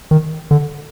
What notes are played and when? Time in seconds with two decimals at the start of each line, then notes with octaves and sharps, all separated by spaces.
0.11 D#3
0.51 D3